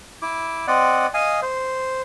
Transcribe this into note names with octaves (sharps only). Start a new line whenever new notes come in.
E4 D6
C4 D5 D#5 F#5
D#5 F5 G#5 D#6
C5